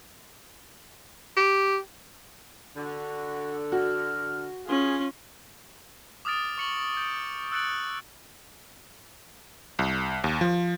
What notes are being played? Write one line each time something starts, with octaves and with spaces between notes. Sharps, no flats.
G4
D3 F#4
F#4 F6
C#4 F4 G#4
D6 D#6 F6 A6 D7
C#6 C#7 F#7
G6 D7 G7
E6 F#6 A6 C#7 D7 F#7
C2
D#2
F3